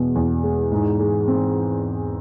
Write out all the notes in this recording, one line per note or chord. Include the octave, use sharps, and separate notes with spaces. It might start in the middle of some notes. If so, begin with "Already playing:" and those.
Already playing: E2 B2 G#3 B3
E2
G#3
G#2
G#3
C4